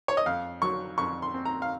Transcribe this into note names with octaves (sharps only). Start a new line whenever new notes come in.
C#5
D#5
F2 F5
F#3 C#6
F2 C#6
C6
C4
A#5
F5